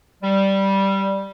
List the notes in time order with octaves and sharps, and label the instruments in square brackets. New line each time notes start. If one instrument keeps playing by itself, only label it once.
[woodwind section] G3